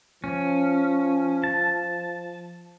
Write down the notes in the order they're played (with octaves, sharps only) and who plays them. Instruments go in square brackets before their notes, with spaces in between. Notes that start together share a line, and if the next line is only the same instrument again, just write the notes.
[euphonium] F3 [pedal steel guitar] C#4
[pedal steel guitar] A5